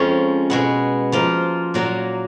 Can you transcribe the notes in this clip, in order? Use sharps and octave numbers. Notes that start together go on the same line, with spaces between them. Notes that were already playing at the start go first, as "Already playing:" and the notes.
Already playing: F2 F3 G#3 C#4 F4
B2 G#3 B3
F3 A#3 F4
A#2 F#3 A#3